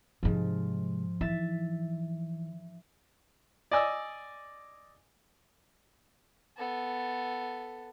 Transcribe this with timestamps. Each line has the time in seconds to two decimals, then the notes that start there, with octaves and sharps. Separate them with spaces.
0.23 G#2 C3 F3 G#3
1.21 E3 E5 A6 B6
3.71 D5 D#5 G#5 E6
6.57 B3 A4